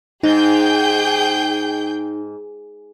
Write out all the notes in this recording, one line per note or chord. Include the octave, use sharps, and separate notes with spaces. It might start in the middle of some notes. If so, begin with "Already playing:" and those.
G#2 D#4 G#4 G5 G6